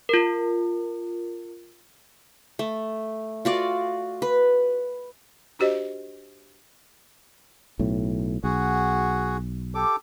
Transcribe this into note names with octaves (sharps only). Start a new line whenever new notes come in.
F4 A#4
A3
F4 F#4 D5
B4
D4 F#4 G4 C5 D#5
B1 A2
B1 F#4 G#4 F#5
G4 A4 D6